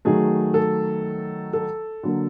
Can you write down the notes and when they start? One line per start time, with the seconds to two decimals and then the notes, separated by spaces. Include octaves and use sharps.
0.05 D#3 F#3 A3 G#4
0.54 A4
1.53 A4
2.03 D3 F#3 A#3